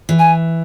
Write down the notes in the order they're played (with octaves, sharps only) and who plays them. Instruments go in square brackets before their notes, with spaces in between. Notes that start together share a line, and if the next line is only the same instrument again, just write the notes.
[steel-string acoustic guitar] E3
[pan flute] G#5